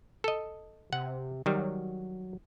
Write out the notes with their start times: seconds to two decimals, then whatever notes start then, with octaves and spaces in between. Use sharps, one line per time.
0.24 A4 D#5
0.93 C3 F#5
1.46 D#3 F#3 G3